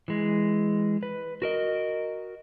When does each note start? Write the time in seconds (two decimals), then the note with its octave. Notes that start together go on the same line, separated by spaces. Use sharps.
0.08 E3 G#3
1.03 B4
1.42 F#4 A#4 D#5